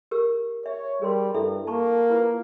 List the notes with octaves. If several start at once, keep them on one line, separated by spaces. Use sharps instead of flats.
G4 A#4 E6
C#5 E5
G3 G#4 A#4 C6
G2 E4 A4 E5
A#3 A5 A#5 C#6
E4 F4 B4